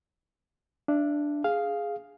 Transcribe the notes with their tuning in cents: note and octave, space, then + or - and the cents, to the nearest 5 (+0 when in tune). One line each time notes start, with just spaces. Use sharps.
D4 +0 E5 +30
G#4 +0 F5 +0